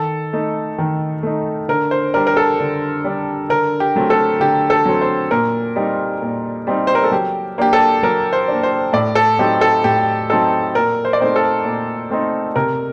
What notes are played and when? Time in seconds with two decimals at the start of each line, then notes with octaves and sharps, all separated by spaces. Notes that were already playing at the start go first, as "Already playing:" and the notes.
Already playing: D#3 A4
0.33 A3 D#4
0.79 D#3
1.23 A3 D#4
1.68 D3 A#4
1.91 C5
2.14 G3 D4 A#4
2.27 A#4
2.37 A4
2.60 D3
3.04 G3 D4
3.49 D3 A#4
3.80 G4
3.96 F#3 A3 C4
4.10 A4
4.40 D3 G4
4.70 A4
4.85 F#3 A3 C4
5.01 C5
5.31 A#2 A#4
5.76 G3 C4 D#4
6.22 A#2
6.67 G3 C4 D#4
6.87 C5
6.95 A#4
7.04 A4
7.12 F#3 G4
7.58 A#3 D4 G4
7.73 A4
8.03 F#3 A#4
8.33 C5
8.48 A#3 D4
8.63 C5
8.93 A2 D5
9.15 A4
9.39 F#3 C4 D#4 G4
9.61 A4
9.84 A2 G4
10.29 F#3 C4 D#4 A4
10.75 A#2 A#4
11.05 C5
11.13 D5
11.20 A3 C4 D#4 C5
11.36 A4
11.65 A#2
12.11 A3 C4 D#4
12.56 C3 A#4